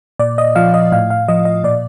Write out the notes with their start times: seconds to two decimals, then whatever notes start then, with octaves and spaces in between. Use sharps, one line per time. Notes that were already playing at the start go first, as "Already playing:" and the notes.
0.19 A#2 D5
0.38 D#5
0.56 F3 F5
0.74 D#5
0.92 A2 F5
1.10 F5
1.28 F3 D#5
1.45 D#5
1.63 A#2 D5